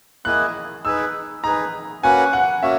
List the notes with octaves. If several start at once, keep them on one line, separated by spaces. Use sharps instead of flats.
A#3 E4 G#4 D#5 F#6
D#4 G#4 B4 E6
D#4 G#4 B4 A#5
A#3 C#4 F#4 B4 F#5 G#5
F#5
A#3 C#4 F#4 E5